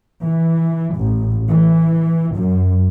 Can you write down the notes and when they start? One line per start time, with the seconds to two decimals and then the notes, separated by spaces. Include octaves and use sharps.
0.24 E3
0.97 A1
1.48 E3
2.35 F#2